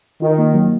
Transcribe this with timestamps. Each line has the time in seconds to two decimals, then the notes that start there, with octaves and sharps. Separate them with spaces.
0.22 D#3 F4
0.38 A#3
0.54 F#3